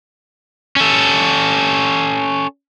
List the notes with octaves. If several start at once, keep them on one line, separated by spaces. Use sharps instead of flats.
C#4 A4